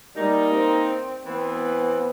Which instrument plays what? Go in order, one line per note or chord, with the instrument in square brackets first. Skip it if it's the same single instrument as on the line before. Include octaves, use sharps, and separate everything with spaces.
[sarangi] G3 [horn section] A#3 D#4
[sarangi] C4
[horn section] E3 C4 [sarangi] B3